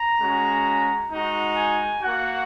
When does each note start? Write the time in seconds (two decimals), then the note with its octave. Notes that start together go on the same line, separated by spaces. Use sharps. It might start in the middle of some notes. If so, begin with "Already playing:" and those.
Already playing: A#5
0.18 G#3 C#4 F#4
1.11 G#3 D#4 F#4
1.56 G#5
2.02 A#3 F#4 F#5